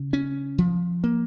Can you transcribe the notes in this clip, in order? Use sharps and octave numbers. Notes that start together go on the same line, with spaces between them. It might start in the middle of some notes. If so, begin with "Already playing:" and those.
Already playing: C#3
C#4
F3
A#3